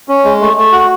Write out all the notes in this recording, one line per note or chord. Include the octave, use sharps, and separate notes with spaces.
C#4
G#3
A3
A3
F#4